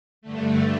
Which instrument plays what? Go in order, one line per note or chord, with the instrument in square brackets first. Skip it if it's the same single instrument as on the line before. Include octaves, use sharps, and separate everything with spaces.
[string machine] G2 D3 A3